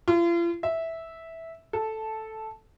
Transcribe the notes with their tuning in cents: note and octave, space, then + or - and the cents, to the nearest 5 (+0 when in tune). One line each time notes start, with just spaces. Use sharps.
F4 -40
E5 -10
A4 -5